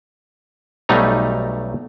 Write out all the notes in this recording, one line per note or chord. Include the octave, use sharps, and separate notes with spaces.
B1 F#3 G3 A3 D#4 A#5